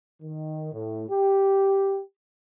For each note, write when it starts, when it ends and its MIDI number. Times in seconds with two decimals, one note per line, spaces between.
0.22 0.72 51
0.73 1.05 45
1.10 2.00 67